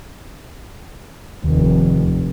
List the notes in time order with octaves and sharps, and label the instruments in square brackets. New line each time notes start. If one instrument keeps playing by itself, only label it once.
[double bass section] F1 [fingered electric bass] D#2